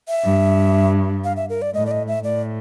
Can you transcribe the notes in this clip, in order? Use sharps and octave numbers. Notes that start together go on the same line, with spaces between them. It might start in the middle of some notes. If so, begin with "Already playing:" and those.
E5
G2
F5
E5
A#4
D5
A2 D#5
D5
D#5
E5
A2 D5